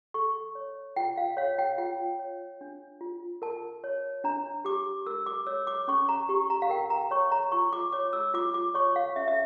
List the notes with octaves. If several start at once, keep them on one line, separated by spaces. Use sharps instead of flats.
A4 C#6
C#5
F4 G5
F5
C#5 F5
G5
F4 G5
C#5
D4
F4
A#4 A5
C#5
D4 A#5
G4 D6
A#4 E6
D6
C#5 E6
D6
C#4 C#6
A#5
G4 C#6
A#5
F5
A#4 G5
A#5
C#5 C#6
A#5
F4 C#6
D6
C#5 D6
E6
F4 D6
D6
C#5 C#6
F5
C#4 E5
E5